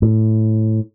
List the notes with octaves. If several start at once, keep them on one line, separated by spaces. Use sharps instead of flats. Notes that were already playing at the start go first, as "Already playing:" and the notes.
A2